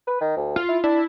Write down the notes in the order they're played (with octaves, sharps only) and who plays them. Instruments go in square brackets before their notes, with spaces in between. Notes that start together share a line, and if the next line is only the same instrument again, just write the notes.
[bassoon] B4
D#3
D2
[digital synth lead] F4
[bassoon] E4
[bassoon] D4 [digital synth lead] E4